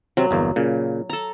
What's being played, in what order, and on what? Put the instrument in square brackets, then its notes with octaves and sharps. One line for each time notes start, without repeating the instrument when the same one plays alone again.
[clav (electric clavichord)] C3 C4 [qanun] F#3
[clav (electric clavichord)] G1 E2 A#3
A#2 C#3
[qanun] A4 A#5